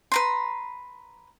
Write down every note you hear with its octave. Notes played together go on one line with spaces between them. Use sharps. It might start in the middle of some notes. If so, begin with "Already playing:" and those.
B4 A#5 C6